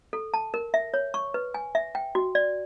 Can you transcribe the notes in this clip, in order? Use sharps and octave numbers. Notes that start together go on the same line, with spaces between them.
A4
A5
A#4
E5
C#5
C#6
B4
G#5
E5
G5
F#4
D5